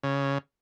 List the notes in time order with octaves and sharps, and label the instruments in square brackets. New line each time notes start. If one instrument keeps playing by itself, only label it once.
[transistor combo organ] C#3